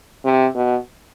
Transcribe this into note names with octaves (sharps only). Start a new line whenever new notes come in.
C3
B2